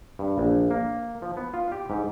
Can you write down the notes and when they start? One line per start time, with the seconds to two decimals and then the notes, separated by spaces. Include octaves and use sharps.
0.19 G2
0.38 A#1
0.71 A#3
1.22 F3
1.37 B3
1.54 F4
1.72 G4
1.90 G#2